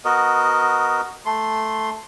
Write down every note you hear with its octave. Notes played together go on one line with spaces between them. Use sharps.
B3 F#4 A#4 D#5
A3 C6